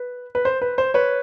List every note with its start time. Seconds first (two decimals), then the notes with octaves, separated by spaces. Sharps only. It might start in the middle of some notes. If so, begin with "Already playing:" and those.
Already playing: B4
0.35 B4
0.45 C5
0.62 B4
0.78 C5
0.94 B4 C#5